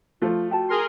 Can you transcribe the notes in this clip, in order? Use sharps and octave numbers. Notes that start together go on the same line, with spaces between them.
F3 A3 F4
F#4 G5 A5
G#4 A#4 C6